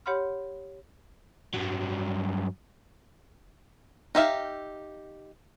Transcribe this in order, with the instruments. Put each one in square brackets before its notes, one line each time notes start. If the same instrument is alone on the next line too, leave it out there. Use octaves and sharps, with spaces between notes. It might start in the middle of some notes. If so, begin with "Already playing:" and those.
[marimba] G4 C#5 F#5 B5 C6 F6
[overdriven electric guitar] G2 F#3
[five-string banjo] D#4 G4 E5 F5